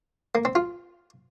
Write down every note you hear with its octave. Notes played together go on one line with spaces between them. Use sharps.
A#3
C4
F4